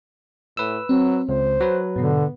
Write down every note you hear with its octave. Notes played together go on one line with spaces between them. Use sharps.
A2 B4 E6
F#3 C4
C#2 C5
F#3 B4
G#2 B2 D3 B3